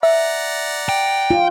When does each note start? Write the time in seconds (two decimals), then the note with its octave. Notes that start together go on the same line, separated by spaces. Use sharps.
0.03 D5 E5 F#5 A#5
0.89 G5
1.31 F4